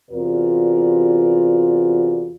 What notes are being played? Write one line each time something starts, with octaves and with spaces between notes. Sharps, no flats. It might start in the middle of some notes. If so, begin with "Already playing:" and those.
E2 C3 F4 F#4 A#4 D5